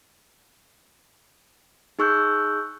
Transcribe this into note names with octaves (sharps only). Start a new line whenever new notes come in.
D#4 G#4 C#6 E6 F#6 G6